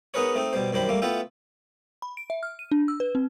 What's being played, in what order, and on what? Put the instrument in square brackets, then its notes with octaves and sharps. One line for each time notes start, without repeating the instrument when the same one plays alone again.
[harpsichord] B3 D#4 G#4 A#4 B4 C#5
A3 C4 D#4
B2 G3 C5
F#2 D#3 G3 C5 B5
G3 A3 A#3
A3 B3 E4 F4 E5 G5
[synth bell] B5
D7
E5
F6
D#7
D4
E6
B4
C4